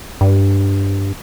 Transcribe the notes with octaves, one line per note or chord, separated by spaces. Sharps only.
G2